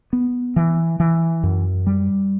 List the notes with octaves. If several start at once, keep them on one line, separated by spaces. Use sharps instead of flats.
B3
E3
E3
F#2
G3